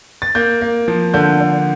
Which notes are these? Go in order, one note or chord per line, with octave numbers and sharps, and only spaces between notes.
A6
A#3 G6
A#3
F3
D3 G6
D3